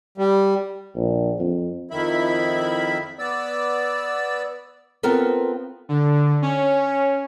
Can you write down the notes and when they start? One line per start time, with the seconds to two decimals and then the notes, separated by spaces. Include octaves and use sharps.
0.18 G3
0.96 A#1
1.39 F2
1.91 F2 D#3 E4 E5 B5
3.19 B3 D5 E6
5.03 B3 C4 F4 A4 A#4
5.89 D3
6.42 C#4